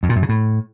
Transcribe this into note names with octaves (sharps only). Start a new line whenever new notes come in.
F2
A#2
F#2
C#3
A2